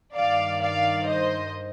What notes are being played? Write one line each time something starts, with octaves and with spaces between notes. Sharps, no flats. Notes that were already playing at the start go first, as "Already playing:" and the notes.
G2 D#3 D5 F5
D5 F5
C5 D#5